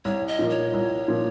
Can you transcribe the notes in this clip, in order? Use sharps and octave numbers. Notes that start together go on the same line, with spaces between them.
C2 C#5
D#5
A#2 F3 A#3
C#5
C2
A#2 F3 A#3